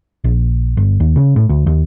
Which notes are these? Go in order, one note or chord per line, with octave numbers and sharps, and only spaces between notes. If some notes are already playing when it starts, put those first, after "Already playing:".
A#1
G1
D#2
C#3
A2
D2
D#2